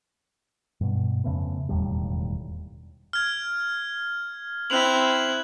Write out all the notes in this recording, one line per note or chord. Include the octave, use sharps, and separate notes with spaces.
G2 B2
F2 C#3 A3 B3
E1 D#2 A2 G3
F6 G#6
C4 E4 F#6 F7 F#7